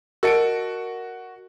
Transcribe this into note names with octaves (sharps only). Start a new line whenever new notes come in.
F#4 A#4 D#5 A5 C#7 D7